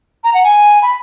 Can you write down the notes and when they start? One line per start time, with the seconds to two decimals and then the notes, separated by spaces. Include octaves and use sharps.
0.24 A#5
0.34 F#5
0.44 G#5
0.82 B5